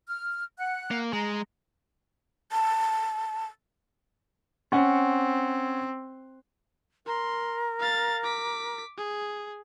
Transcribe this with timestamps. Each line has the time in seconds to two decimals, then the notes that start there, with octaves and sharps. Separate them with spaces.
0.08 F6
0.58 F#5 F#6
0.91 A#3
1.13 G#3 A#5
2.52 A5
4.72 C4 C#4 F#5
7.06 A#4 C6
7.79 F5 A6
8.24 D6 B6
8.97 G#4